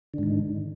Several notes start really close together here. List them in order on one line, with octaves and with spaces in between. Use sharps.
D3 G#2 D#3